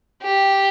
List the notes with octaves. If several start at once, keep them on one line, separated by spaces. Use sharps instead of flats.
G4